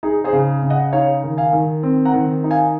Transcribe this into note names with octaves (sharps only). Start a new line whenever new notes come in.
D#4 G#4
G#4 C5
C#3
C#3
D#5 F#5
D#4 C#5 F5
D#3
F5 G#5
D#3
C4
F#5 A#5
D#3
D#4
F5 G#5